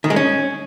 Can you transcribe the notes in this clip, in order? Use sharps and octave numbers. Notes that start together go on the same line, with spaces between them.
D#3
G#3
C#4